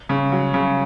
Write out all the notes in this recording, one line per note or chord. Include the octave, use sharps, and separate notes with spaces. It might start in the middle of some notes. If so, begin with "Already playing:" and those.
C#3
F#3
C#3